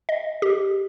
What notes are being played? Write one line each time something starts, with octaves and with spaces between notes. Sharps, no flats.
D#5
G4